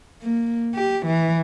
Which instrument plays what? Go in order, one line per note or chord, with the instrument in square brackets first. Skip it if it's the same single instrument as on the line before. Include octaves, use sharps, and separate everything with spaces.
[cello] A#3
G4
E3